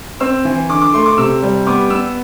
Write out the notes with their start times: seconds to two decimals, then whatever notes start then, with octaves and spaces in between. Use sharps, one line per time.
0.20 C4 E6
0.45 E3
0.69 D3 D6
0.81 D6
0.93 A3 C6
1.06 D6
1.18 C3 E6
1.42 G3
1.67 B3 D6
1.90 B3 E6